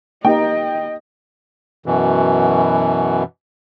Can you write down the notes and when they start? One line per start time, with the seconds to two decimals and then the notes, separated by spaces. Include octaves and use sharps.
0.25 A#3 D#4 G4 D#5 G5
1.86 F#2 B2 E3